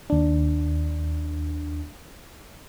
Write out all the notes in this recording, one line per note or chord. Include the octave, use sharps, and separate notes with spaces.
D#2 D4